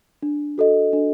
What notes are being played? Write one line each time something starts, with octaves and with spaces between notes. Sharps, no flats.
D4
F#4 A4 D#5
D4